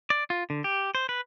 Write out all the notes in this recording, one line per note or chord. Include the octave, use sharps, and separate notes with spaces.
D5
F4
D3
G4
C5
B4